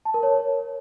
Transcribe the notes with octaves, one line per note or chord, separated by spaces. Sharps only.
A5
A#4
C#5